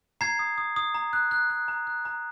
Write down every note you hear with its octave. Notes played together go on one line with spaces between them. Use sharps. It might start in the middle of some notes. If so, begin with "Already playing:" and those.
A#5 G#6 C7
D#6
D#6
D#6
A#5
F#6
F#6
F#6
A#5
F#6
A#5